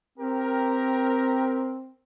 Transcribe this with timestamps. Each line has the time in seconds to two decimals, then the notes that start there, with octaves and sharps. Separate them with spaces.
0.18 C4 G4 A#4